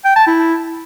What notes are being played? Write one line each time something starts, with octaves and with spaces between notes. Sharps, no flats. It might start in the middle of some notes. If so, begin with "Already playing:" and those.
G5
A5
E4